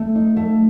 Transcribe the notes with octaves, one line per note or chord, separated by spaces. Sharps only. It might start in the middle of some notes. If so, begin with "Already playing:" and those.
Already playing: A3
D#4
A3